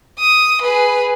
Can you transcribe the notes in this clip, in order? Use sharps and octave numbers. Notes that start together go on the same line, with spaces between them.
D#6
G#4 B4